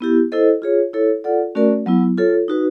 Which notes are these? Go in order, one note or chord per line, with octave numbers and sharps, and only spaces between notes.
B3 E4 G4
E4 A4 C5 D#5
F4 G#4 C#5
E4 A4 C#5
F4 A4 D5 F#5
A3 C#4 F#4 A#4 D5
F#3 B3 E4
F4 A4 C#5
D#4 F#4 B4